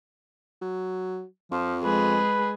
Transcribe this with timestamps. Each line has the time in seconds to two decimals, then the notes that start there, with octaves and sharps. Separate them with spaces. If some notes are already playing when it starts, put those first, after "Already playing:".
0.61 F#3
1.51 F2 F3
1.84 G#3 G#4 B4